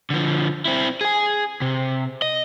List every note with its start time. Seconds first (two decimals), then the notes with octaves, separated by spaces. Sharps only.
0.10 D3 F3
0.65 C4 E4
1.01 G#4 G#5
1.62 C3
2.22 D#5